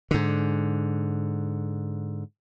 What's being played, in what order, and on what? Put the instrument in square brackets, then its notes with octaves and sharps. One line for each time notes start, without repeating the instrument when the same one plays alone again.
[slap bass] G#2 D3